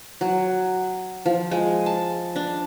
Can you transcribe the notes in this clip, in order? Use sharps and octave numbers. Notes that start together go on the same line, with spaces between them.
F#3
F3
G#3
A5
D4